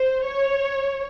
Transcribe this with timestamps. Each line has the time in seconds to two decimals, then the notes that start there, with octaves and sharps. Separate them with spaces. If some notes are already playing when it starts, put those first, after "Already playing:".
Already playing: C5
0.25 C#5